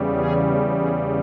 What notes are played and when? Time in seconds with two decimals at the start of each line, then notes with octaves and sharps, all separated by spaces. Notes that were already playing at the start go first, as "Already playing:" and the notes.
Already playing: E2 C#3 G3
0.13 G#4
0.78 G#4